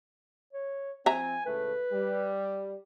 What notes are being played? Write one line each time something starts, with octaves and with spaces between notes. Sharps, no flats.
C#5
F3 C4 E5 G#5 A#5
C#2 A2 A3 B4
G3